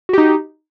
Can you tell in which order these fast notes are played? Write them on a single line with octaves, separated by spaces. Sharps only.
F#4 G4 D#4